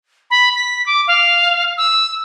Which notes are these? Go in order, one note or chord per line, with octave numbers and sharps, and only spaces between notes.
B5
B6
D6
F5
E6